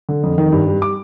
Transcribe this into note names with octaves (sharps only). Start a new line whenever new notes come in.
D3
F2
D#3
G2
G3
D6